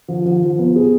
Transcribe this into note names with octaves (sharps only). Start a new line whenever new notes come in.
F3
F3
F3
B3
G#4